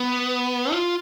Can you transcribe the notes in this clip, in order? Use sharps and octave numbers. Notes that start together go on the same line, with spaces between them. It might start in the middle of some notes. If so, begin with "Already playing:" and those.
Already playing: B3
F4